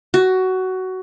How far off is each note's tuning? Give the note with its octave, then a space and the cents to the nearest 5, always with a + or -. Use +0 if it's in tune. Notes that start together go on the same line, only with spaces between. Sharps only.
F#4 +15